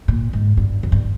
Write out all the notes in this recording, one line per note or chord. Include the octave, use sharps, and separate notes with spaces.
A#2
G#2
G2
F2
G2